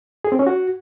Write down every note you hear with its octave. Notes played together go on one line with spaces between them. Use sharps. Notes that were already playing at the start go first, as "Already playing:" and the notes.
G#4
C4
C#4
F#4